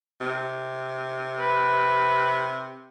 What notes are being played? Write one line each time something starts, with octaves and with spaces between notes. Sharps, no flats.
C3
B4